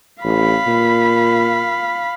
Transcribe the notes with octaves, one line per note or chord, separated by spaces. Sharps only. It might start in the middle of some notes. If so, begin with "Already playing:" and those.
A1 F5 B5
A#2